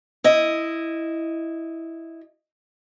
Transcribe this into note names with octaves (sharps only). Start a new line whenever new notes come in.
E4 D#5